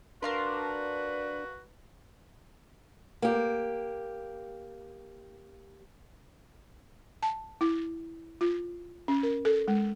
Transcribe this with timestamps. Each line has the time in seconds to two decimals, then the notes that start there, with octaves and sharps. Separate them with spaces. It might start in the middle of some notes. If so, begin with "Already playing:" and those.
0.23 D4 F#4 A#4 B4 F5 C6
3.22 A#3 G4
7.23 A5
7.61 E4
8.41 F4
9.08 C#4
9.23 A#4
9.45 A4
9.68 G#3